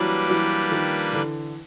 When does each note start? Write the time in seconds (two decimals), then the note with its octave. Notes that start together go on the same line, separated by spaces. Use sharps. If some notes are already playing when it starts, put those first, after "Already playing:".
Already playing: E3 F#3 G3 A#3 D4 G4 B4
0.30 E3 F#3
0.71 D#3 F3
1.13 D3 E3